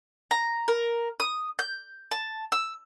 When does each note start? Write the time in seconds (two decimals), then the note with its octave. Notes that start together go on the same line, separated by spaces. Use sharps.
0.31 A#5
0.68 A#4
1.20 D#6
1.59 G6
2.11 A5
2.52 E6